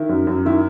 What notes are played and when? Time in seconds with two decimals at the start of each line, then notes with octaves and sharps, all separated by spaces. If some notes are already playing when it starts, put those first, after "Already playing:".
Already playing: D#3 E4
0.09 F#2
0.27 F#2
0.45 D#3 E4